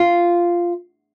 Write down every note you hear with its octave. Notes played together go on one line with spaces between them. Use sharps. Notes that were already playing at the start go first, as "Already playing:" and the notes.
Already playing: F4